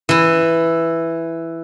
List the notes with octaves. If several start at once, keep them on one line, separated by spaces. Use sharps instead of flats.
E3 E4